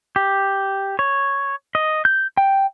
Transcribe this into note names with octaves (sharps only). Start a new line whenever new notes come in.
G4
C#5
D#5
G6
G5